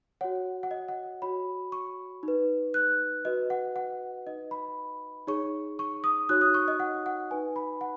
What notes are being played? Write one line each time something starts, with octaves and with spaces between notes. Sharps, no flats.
F#4 C#5 F#5
F#5
D#5
F#5
F#4 C#5 B5
C#6
D#4 B4
F#6
F#4 B4 D#5
F#5
F#5
D#4 B4 D#5
B5
D#4 G#4 C#5 C#6
C#6
D#6
D#4 F#4 C#5 F#6
D#6
C#6
D#5
F#5
F#5
D#4 B4 G#5
B5
F#5